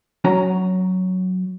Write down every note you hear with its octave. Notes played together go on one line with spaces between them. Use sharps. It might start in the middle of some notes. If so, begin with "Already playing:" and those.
F#3 C#4 A#5